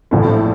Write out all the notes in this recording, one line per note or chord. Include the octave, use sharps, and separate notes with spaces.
A#1 A2 E3 A3